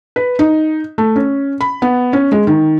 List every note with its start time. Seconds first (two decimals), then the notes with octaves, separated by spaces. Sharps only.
0.16 B4
0.39 D#4
0.98 A3
1.16 C#4
1.61 B5
1.82 B3
2.13 C#4
2.32 G#3
2.47 D#3